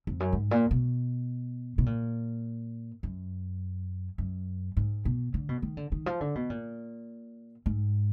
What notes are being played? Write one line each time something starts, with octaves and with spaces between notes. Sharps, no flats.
F2
F#2
G#2
A#2
B2
B2
A#2
F#2
F#2
G#2
B2
D3
B2
D#3
D3
D#3
F3
D3
B2
A#2
G#2